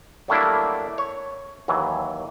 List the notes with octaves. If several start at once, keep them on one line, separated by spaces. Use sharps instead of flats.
F#3 G3 A3 A#3 D4 E4
C#5
D#2 E3 F#3